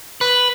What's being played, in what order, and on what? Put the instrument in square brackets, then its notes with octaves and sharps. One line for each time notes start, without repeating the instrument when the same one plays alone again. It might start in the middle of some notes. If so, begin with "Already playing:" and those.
[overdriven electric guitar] B4